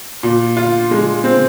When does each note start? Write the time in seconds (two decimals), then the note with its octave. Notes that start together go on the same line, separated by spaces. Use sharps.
0.23 A#2
0.57 F4
0.91 G#3
1.24 C4